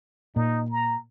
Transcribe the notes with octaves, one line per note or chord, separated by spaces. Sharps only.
A#2 D#4
A#5